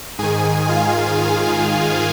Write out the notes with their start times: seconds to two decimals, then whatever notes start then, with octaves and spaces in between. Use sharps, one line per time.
0.19 G#2 D#3 G#4 G#5
0.69 F4 F5
1.71 G#4 G#5